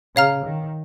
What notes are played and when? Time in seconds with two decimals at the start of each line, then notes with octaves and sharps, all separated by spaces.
0.16 C#3 C#5 F5 A#5 F6
0.45 D#3